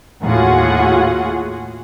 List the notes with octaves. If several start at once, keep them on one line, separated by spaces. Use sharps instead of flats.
D#2 A2 F4 F#4 G#4 F#5